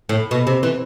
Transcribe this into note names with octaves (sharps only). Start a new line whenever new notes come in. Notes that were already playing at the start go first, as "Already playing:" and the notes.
A2
B2
C3
E3